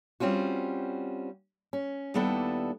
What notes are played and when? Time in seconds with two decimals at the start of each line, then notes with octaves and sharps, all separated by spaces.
0.20 G3 C4 C#4 F4 F#4
1.73 C#4
2.14 D#2 G3 B3 D4 E4 A4